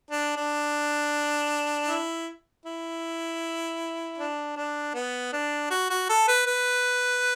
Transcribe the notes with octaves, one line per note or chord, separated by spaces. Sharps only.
D4
D4
E4
E4
D4
D4
B3
D4
F#4
F#4
A4
B4
B4